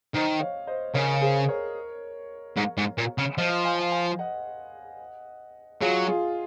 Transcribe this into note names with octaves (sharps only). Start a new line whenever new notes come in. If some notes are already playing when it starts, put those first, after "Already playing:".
D#3 C5 D#5
C#5 F5
C5 D#5
C#3 A#4 C#5
G#4 C5
A#4 C#5
G#2
G#2
A#2
C#3
F3 C5 D#5
F5 G#5
F5 G#5
D#5 F#5
F#3 F4 G#4
F4 G#4